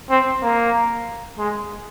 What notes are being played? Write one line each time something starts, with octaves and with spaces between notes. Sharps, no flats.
C4
A#3
G#3